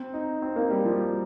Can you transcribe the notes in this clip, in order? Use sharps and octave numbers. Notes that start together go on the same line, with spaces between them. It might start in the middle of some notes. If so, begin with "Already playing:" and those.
Already playing: C4
D#4
C4
A#3
G3
F3